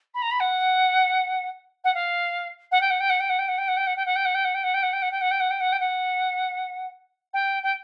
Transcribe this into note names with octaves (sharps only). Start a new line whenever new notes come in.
B5
A#5
B5
F#5
F#5
F5
F#5
G5
F#5
G5
F#5
G5
F#5
G5
F#5
G5
F#5
G5
F#5
G5
F#5
G5
F#5
G5
F#5
G5
F#5
G5
F#5
G5
F#5
G5
F#5
G5
F#5
G5
F#5
G5
F#5
G5
G5